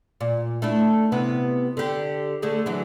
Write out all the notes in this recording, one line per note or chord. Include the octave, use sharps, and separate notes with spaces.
A#2
A3 D4 E4
C3 B3 E4
D3 G4
D3 A3 G#4
D3 E3 F#3